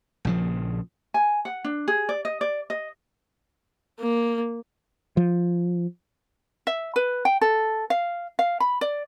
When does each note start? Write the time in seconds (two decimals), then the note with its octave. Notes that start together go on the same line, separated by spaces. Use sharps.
0.25 A#1 C#3 F3
1.14 G#5
1.45 F#5
1.64 D4
1.88 G#4
2.09 D5
2.25 D#5
2.41 D5
2.70 D#5
4.00 A#3
5.17 F3
6.67 E5
6.96 B4
7.25 G5
7.41 A4
7.90 F5
8.39 F5
8.60 B5
8.81 D5